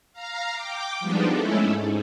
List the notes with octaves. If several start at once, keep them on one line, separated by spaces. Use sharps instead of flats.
F5 A#5
G5 D6
F3 G3 G#3 B3 D4 D#4
G#3 A3 C#4 E4 A4
G#2